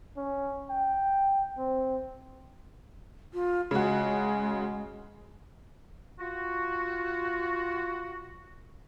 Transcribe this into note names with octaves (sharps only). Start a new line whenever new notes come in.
C#4
G5
C4
F4
C#3 G#3 F#4
F4 F#4